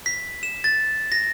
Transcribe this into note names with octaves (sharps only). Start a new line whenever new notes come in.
B6
E7
A6
A#6